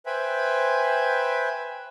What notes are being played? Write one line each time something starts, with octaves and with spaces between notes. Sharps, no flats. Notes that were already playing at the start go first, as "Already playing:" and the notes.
B4 C5 E5 G5 G#5 B5